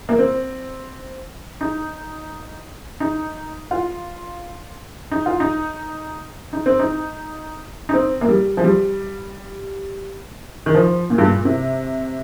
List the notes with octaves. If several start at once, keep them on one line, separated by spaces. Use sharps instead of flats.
A#3
C4
D#4
D#4
F4
D#4
F4
D#4
D#4
C4
D#4
D#4
C4
A#3
G3
F3
G3
D#3
F3
A#2
G2
A#2
C3